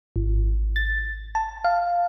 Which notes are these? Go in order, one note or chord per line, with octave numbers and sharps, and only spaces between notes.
G#1
A6
A5
F5